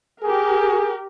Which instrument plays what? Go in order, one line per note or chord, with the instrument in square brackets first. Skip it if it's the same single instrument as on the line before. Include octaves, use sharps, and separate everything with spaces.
[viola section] G4 A#4 [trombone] G#4